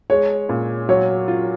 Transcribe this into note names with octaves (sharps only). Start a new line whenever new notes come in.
G#3 C#5
A#2
F#3 C#5
F4